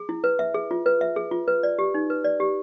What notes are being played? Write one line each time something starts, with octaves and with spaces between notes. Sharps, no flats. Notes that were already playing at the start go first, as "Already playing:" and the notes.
Already playing: G#4
E4
B4
E5
G#4
F4
B4
E5
G#4
F4
B4
D5
G4
D#4
B4
D5
G4